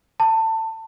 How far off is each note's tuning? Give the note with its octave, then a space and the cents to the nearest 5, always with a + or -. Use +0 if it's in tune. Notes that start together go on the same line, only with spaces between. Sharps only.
A5 +20